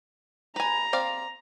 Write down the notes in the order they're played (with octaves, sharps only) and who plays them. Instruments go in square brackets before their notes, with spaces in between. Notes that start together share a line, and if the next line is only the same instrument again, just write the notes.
[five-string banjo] B4 G#5 [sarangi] A#5
[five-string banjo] C4 D5 F5